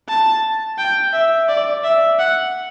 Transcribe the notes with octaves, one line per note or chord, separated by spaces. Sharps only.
A5
G5
E5
D5
E5
F#5